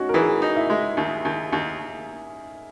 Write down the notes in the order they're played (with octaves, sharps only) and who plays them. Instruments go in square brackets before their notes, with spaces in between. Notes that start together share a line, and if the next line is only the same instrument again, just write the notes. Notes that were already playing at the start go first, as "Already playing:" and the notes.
Already playing: [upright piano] C#4 D#4 F#4
A#4
[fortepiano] E3 [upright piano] G#4
[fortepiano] D#4
[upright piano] E4
[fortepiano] G#3
D#2
D#2
D#2